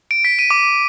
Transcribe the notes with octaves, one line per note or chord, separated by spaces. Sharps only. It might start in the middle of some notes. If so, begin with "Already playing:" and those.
D7
B6
D#7
D6